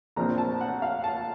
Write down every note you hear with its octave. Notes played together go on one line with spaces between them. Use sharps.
A#1 A#2 F3 C4 A#5
A5
F#5
F5
A5